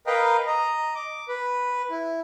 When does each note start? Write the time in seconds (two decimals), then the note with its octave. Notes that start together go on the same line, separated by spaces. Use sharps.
0.07 A#4 B4 D#5 F5 G5 A#5
0.47 D#5 A#5
0.95 D6
1.29 B4
1.90 E4